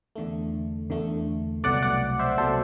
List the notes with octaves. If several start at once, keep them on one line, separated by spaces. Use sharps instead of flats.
E2 D3 A3
E2 D3 A3
C2 B2 F#3 A3 D5 F#5
D5 F#5
C5 E5
C2 B2 F#3 A3 A4 C5